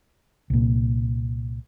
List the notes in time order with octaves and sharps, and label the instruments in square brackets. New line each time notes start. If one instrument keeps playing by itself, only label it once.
[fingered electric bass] C2 A#2